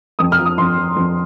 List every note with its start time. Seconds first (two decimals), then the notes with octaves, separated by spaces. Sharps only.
0.19 F2 D#6
0.32 F6
0.39 F3
0.46 D#6
0.58 F2 C6
0.77 F3
0.96 F2